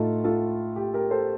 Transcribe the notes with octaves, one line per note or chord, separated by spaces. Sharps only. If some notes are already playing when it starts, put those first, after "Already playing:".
Already playing: A2 A3 D#4 F4 A4
F4 A4
G4
G4 A#4
A4 C5